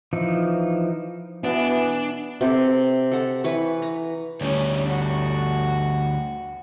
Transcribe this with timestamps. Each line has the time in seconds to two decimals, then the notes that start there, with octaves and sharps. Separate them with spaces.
0.13 E3 F3 D#4
1.44 B2 E3 B3 D4
2.41 C3 C4 G4 A4
3.12 A4 F#5
3.44 E3 B4 C#5
3.82 A#5
4.41 D2 G3 C#4
4.88 F#4